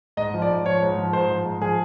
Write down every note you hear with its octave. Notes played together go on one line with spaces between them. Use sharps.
G#2 D#5
F3
D5
G#2
F3 C#5
G#2
F3
G#2 C5
F3
G#2
F3 G#4